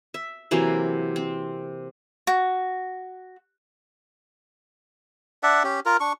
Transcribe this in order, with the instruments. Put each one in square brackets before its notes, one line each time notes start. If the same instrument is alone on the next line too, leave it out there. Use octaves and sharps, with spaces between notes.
[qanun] E5
C3 E3 F#3 A#3
C4
[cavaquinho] F#4
[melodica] D4 D5 E5 F#5
C#4 G4
F4 A#4
D4 C#6